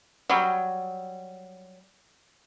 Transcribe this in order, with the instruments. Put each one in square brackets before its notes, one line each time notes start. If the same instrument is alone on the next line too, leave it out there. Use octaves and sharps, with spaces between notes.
[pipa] F#3 G3